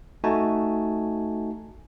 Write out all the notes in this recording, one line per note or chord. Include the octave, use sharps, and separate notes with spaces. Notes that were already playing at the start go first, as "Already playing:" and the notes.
A3 D#4 F#4 G#5 A5